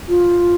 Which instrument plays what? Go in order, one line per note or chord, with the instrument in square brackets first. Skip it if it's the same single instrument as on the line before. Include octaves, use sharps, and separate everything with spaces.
[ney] F4